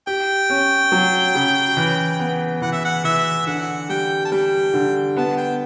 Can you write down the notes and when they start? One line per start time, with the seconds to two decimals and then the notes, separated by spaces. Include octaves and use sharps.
0.07 G4 G5
0.50 C#4
0.92 F#3
1.35 C#3
1.77 E3
2.19 B3
2.62 E3 F#5
2.73 E5
2.85 F#5
3.04 E3 E5
3.47 D3 F#5
3.89 G3 G5
4.25 A5
4.31 G3 G5
4.74 D3
5.16 B3 A5
5.37 G5